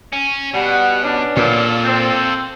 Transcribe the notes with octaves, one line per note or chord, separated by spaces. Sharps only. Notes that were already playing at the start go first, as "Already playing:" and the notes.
C#4
B2 G3 F#5
B3 C#4 D4
A#2 F4 A4
C4